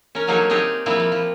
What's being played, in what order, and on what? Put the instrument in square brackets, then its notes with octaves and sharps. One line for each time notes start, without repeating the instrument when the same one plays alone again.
[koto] C#4 A#4
D3 F#3 A#3 D#4 G#4 C#5
C4 D#4 G4 G#4 A#4
F3 G3 A#3 C4 E4
A#3
F3